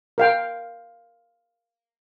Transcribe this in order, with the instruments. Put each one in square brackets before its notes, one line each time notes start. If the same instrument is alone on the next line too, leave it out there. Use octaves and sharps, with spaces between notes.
[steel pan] A#4 F5 G5